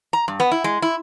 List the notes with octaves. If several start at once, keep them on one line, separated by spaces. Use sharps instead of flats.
A#5
G2
B3
E4
G#3
E4